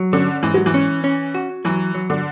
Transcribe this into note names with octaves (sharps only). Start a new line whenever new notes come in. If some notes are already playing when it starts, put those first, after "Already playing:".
Already playing: F#3
D3 C#4
G#2 E3
F#3
E3
C#4
C#4
F#4
E3 F#3
F#3
D3